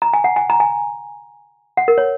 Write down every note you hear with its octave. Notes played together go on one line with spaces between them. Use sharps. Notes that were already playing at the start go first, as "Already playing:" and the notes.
A#5
G#5
F#5
G#5
A#5
G#5
F#5
A#4
C#5